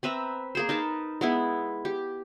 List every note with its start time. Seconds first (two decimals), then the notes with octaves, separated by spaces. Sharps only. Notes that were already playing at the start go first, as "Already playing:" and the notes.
0.03 C4 B4 E5 A#5
0.55 A#3 G#4 C5
0.69 D#4 A#4 B4 A5
1.21 G#3 B3 E4
1.85 G4